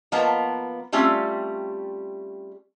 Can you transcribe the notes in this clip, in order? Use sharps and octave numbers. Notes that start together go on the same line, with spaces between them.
F3 A#3 B3 D#5 A5 A#5
G3 A3 C4 C#4 F4 G4